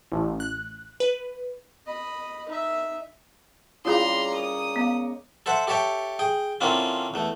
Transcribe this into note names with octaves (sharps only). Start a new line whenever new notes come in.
A1
F#6
B4
D#5 B5
D#4 E5
C#3 G3 A#3 E4 F4 G#4 A#5 C6
A#4 C#5 D#6
G#3 A#3 B3
A4 C5 E5 F#5
G4 A4 C#5 E5 G5
G#4 G5
D3 A#3 C4 C#4 E4 F4
E2 A3